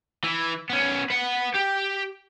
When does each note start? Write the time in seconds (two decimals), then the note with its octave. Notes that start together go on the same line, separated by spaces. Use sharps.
0.24 E3
0.70 B3 C#4
1.10 B4 F#5
1.55 G4